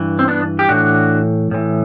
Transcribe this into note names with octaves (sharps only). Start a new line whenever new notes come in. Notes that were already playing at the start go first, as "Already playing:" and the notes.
Already playing: G2 E3
C4
B3 D4
G4
A2 E3 D4 F#4
A2 E3